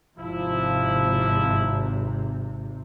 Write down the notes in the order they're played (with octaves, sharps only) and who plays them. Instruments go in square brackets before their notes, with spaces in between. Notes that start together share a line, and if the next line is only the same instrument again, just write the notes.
[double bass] G#1 C3 [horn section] F3 E4